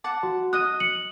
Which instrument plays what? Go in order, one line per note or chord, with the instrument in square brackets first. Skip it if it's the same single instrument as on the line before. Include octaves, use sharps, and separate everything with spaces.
[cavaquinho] F#5 A5 D6
[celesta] F#4
[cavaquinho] D#5 D#6 [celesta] F#6 D#7
[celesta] C#7 F#7